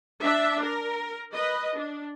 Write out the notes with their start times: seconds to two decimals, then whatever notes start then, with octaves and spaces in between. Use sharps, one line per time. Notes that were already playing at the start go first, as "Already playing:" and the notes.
0.22 D4 E5
0.62 A#4
1.32 B4 D#5
1.75 D4